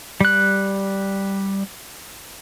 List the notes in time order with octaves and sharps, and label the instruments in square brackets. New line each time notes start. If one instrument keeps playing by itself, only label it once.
[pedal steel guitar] G3 F#6